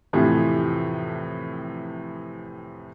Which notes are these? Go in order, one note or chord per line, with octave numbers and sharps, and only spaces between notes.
F2 A2 C3 E3 F3